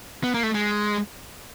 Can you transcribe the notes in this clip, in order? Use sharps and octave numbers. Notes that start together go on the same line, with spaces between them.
B3
A#3
A3
G#3